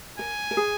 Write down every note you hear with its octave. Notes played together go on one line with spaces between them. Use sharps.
A#4 G#5
A#4
G#4